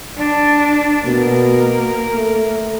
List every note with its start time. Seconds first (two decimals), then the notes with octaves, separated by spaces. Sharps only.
0.18 D4
1.06 B2 A#3 A#4
2.16 A3